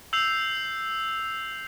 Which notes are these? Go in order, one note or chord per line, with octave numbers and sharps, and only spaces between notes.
E6 G6 C7 F7